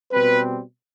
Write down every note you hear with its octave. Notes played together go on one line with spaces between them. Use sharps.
B2 G3 C4 B4